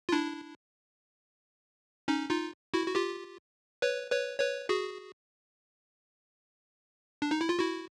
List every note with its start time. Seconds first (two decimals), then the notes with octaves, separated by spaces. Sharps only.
0.09 F4
0.12 D4 E4
2.08 C#4 D#4
2.30 D#4 F4
2.74 E4 F#4
2.87 F#4
2.95 F4 G4
3.82 B4 C#5
4.11 B4 C#5
4.40 B4 C#5
4.69 F#4 G#4
7.22 D4
7.31 D#4
7.41 E4
7.49 F4
7.59 E4 F#4